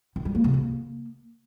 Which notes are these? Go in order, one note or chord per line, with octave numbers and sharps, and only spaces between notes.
D#3
G3
A#3
C3
A#3